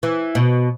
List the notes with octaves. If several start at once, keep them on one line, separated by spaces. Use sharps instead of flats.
E3
B2